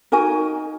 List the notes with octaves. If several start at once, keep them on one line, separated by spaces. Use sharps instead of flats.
D#4 F#4 A#4 G#5